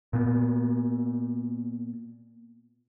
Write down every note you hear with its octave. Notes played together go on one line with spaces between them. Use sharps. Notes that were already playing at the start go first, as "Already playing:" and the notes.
A#2 B3